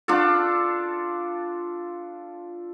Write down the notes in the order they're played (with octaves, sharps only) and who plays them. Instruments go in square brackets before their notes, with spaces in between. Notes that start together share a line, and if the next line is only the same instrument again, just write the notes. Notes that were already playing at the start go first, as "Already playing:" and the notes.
[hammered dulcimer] D4 F4 A4